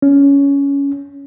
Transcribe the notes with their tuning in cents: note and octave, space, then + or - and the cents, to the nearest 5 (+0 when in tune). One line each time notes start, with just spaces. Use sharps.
C#4 +15